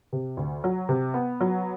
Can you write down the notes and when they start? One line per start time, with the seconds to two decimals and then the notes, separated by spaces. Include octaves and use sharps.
0.13 C3
0.37 D2
0.64 F#3
0.89 C3
1.14 B3
1.41 F#3